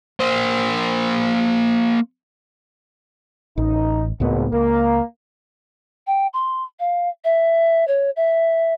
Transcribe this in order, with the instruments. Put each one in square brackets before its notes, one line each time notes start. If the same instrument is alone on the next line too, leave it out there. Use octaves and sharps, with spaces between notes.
[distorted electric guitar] A#3 C5
[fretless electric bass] A1 [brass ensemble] D#4
[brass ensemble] G#1 [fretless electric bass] C#2 A2 B3
[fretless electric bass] C#2 [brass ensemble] A#3
[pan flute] G5
C6
F5
E5
C#5
E5